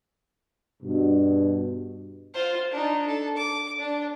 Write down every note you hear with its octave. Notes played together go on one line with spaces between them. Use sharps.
G2 B2
F4 C5
D4 D#4
A4
D6
D4